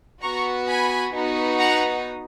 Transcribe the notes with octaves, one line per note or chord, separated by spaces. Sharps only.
B3 F#4 A#5 C#6
G#5 B5
B3 D#4 F#4
F#5 A#5